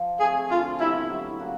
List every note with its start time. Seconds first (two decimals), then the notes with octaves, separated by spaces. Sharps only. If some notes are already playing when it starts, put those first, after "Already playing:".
Already playing: F3
0.20 A3 C4 G#4
0.50 D3 F4
0.79 G3 B3 E4
1.10 F#3
1.39 A#3 C#4 F#4